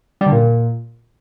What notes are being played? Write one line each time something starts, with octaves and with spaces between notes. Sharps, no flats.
G3
D3
A#2